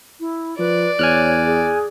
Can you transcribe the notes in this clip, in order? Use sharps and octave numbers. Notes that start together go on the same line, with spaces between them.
E4
F3 B4 D5
E2 C#5 G#5 F6 F#6
G#4